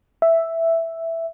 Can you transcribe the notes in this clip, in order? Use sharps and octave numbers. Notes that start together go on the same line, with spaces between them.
E5